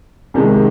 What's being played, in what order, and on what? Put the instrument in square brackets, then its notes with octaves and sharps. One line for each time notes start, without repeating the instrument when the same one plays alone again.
[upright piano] C2 C3 D#3 G#3